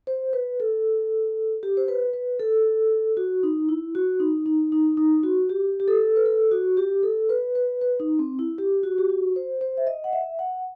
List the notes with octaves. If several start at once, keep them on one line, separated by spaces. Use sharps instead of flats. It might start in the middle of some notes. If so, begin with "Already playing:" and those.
C5
B4
A4
G4
C5
B4
B4
A4
F#4
D#4
E4
F#4
D#4
D#4
D#4
D#4
F#4
G4
G4
A4
B4
A4
F#4
G4
A4
B4
B4
B4
D#4
C4
E4
G4
F#4
G4
F#4
C5
C5
E5
D#5
F#5
E5
F#5